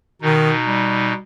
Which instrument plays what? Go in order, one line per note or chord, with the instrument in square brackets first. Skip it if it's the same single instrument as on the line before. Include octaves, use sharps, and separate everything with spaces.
[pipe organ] B2 D#4 [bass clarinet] D#3
[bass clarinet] G3